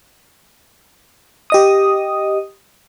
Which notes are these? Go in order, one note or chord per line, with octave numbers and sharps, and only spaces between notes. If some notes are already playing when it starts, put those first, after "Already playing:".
G4 D#5 D#6